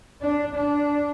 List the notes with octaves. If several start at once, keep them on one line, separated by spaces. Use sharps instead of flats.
D4
D4